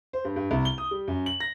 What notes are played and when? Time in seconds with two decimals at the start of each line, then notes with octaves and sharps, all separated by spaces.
0.13 C5
0.25 G2
0.36 G2
0.51 C2
0.65 G7
0.78 D#6
0.91 G3
1.08 F#2
1.26 F#7
1.40 A#6